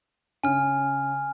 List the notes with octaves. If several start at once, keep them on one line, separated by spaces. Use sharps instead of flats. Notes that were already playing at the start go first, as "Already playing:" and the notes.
C#3 G#5 F6